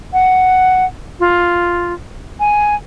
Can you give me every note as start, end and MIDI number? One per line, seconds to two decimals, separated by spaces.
0.13 0.85 78
1.20 1.93 65
2.40 2.75 80